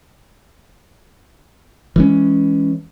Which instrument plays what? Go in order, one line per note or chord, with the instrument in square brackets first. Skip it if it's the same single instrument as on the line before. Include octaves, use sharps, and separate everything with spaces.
[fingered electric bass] E3 G#3 C#4